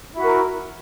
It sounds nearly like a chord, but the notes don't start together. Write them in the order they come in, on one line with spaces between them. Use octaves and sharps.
E4 F#4 A#4